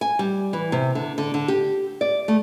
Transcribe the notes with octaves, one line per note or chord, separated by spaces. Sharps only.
G#5
G3
E3
C3
D3
D3
D3
G4
D5
A3